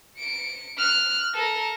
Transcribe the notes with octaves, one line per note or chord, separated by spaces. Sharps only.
C#7 D7
F6 F#6
A4 A#4